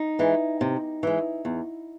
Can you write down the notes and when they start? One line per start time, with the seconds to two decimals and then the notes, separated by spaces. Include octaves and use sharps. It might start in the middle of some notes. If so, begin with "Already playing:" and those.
Already playing: D#4
0.19 E3 G#3
0.61 C3
1.03 E3 G#3
1.45 E2